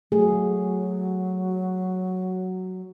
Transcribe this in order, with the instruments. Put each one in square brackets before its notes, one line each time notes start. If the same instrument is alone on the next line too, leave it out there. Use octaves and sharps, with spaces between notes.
[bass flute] F#3 [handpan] A3 G#4